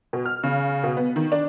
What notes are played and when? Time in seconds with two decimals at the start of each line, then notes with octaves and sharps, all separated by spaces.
0.13 B2
0.26 F6
0.43 C#3
0.83 B2
0.97 B3
1.16 D#3
1.32 D4